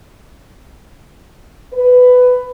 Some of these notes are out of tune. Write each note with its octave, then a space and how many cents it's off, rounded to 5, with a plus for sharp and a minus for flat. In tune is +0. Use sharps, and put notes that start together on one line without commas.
B4 +15